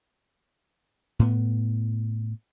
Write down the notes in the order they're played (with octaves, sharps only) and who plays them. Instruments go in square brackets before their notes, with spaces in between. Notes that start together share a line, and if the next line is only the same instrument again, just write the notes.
[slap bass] A2 B3